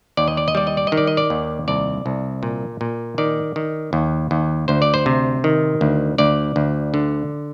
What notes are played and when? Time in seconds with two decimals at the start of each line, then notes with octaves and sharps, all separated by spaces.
0.17 D#2 D5
0.28 D#5
0.37 D5
0.48 D#5
0.55 G3 D5
0.67 D#5
0.77 D5
0.87 D#5
0.92 D#3
0.97 D5
1.07 D#5
1.17 D5
1.30 D#2
1.68 C2 D5
2.06 C2
2.43 A#2
2.81 A#2
3.18 D#3 D5
3.56 D#3
3.93 D#2
4.31 D#2
4.68 D2 C5
4.82 D5
4.94 C5
5.06 C3
5.44 D#3
5.81 D2
6.18 D2 D5
6.56 D2
6.94 D3